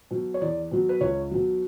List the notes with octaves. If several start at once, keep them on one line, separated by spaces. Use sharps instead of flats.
B2 F#3
C#5
E2 D5
B2 F#3
B4
C#2 C#5
B2 F#3